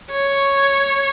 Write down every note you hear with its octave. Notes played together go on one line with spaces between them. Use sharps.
C#5